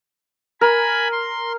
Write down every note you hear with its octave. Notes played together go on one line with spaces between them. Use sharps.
A#4 G#5 B5
C6